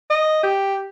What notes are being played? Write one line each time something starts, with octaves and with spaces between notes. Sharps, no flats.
D#5
G4